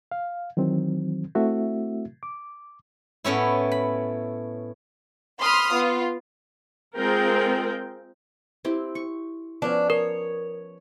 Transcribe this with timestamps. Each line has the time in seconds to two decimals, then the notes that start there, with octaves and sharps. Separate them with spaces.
0.12 F5
0.57 D#3 E3 F#3 C4
1.35 A3 C4 E4 F#4 E5
2.23 D6
3.24 A2 B3 C#4 E4
3.71 B5
5.41 B5 C6 D#6 F6
5.74 B3 F4
6.96 G#3 C4 F4 A#4 G5
8.65 C4 E4 G4
8.95 C#6
9.62 F3 B3 C#4 D4
9.90 A#4 C#5